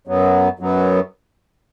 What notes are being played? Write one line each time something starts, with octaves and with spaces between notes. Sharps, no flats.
F#2 F#3 B3
F#2 F#3 B3